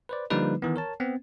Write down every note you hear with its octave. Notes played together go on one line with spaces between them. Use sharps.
B4 C5 D5
D3 F3 G3 A#3 D#4 B4
D#3 E3 B3
A#4 C#5 A5
B3 C4